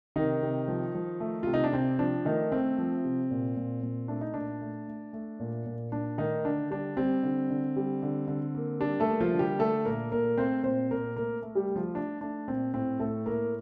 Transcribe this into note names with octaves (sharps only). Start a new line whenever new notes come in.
C3 D#3 D#4
C3
F3
F3
A3
C3 F4
D#4
D4
C3 C4
F3 D4
D#3 A3 D#4
A3 C4
F3
C3
A#2
A#2
A#2
A3 D4
D#4
A#2 D4
A3
A3
A3
A#2
A#2
A#2 D4
D#3 A3 D#4
D3 D4
G3 D4
G3 C4
D3
D3
G3
D3
D3
A#3
G3 D4
A3 A4
A#3
F3 F4
D3
G3 G4
A3 A4
A#2 A#3 A#4
A#2 A#3 A#4
A3 C4 C5
A#2 C4 C5
A#2 A#3 A#4
A3 A#3 A#4
A3
G3 G4
A3
F3 F4
A3 D4
A3 D4
A#2 C4
A2 C4
A2 A3 A4
A2 A#3 A#4